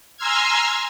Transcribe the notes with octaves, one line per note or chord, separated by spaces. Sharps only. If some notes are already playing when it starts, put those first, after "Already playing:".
G#5 A#5 C6 E6 F6 G#6